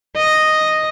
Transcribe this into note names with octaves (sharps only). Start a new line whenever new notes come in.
D#5